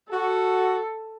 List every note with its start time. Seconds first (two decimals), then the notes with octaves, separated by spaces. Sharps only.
0.12 F#4 A4